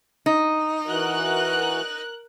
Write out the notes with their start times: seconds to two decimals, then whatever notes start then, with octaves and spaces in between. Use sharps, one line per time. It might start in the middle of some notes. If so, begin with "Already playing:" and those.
0.26 D#4
0.87 E3 F#4 A#4 F#6